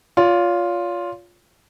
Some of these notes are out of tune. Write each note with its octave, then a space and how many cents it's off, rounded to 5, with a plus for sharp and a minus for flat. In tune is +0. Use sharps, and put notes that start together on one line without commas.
F4 +5 C#5 +45